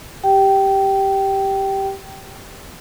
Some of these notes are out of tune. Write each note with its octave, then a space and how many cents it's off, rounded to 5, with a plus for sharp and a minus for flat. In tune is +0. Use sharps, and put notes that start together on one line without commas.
G4 +0 G5 -15